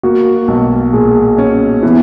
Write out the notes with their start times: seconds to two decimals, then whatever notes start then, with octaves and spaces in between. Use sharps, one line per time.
0.03 A#3 F#4
0.48 B1
0.93 A#2 G#4
1.38 C#4
1.83 E3 B3